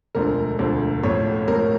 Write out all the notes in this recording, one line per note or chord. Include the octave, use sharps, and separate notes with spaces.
E1 D2 D3 F3 A#4
E1 D2 D3 F3
A1 A2 F3 C#5
A1 A2 F3 A#4